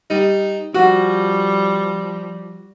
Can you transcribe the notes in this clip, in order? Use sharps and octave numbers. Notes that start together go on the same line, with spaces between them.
G3 D#4
F3 G3 F#4